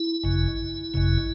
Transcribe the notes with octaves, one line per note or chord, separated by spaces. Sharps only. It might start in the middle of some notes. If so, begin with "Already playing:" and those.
Already playing: E4
G#1 F#2 C#3
G#1 F#2 C#3